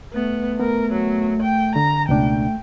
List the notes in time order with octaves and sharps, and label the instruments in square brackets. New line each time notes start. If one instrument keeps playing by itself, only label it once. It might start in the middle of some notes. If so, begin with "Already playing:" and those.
[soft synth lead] A3 [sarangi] B3
[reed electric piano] B3 [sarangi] A#4
[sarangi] F#3
G5
[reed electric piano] D3 [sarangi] A#5
[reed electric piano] C#2 B2 D4 [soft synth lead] A3 [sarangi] G5